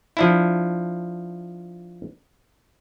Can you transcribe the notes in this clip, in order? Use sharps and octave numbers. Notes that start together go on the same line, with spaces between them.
F3 D4 E4